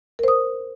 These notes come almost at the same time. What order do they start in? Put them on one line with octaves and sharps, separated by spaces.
A#4 C5 D#6